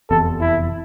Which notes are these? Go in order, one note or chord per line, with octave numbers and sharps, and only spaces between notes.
F1 E2 C3 A4
E4